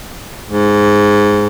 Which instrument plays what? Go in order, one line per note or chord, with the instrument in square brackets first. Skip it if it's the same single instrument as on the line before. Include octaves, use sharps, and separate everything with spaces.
[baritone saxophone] G#2